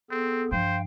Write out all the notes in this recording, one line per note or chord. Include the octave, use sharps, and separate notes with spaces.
B3 C4 G#4 A4
G2 F3 C5 F5 G5